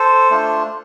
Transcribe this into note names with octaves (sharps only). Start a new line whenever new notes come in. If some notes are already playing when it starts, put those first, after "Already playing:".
Already playing: A4 C5
A3 D4 F4